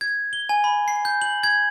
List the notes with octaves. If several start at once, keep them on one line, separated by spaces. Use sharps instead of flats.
G#6
G7
G#5
B5
C7
G6
F#7
G#6